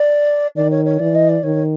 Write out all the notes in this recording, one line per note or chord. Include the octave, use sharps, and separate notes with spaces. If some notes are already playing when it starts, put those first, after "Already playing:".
Already playing: D5
D#3 D5
C#5
C#5
E3 D5
D#5
D5
D#3 C#5